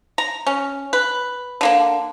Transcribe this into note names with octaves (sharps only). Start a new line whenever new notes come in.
A#5
C#4
B4
D3 A#3 D4